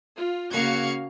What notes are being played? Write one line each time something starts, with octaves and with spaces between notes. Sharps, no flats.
F4
C#3 A#3 F#4 F5 G#6 C#7